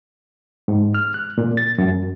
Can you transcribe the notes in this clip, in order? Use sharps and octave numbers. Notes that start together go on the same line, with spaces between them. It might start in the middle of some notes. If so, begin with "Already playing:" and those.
G#2
F6
F#6
A#2
A6
F#2